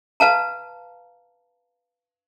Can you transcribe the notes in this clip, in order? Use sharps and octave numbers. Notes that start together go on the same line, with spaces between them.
B4 F5 A5 A#5